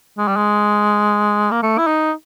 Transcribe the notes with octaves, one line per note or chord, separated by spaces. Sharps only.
G#3
G3
G#3
A#3
A3
E4
D#4